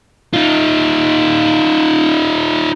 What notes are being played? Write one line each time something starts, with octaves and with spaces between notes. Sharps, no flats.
D#4 F4